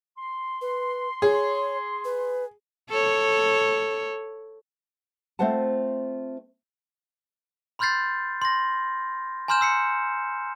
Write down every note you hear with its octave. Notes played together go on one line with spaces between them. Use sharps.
C6
B4
G#4 C#5
B4
A4 C#5
A3 C4 F4 C5 F#5 A5
B5 C6 F6 G6 A6 C7
C6 A#6
G#5 A#5 C6 F6 G6 E7
E6 C7 C#7